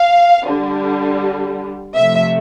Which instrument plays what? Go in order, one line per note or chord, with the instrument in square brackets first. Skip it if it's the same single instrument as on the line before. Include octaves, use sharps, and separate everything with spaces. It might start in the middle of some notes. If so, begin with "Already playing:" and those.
Already playing: [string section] F5
D3
G3
C3 F3 A3 E5